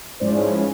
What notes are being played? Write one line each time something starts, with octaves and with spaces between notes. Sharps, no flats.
G#2 F3 G#3 C#4 E4 C5 D5
B4 C#5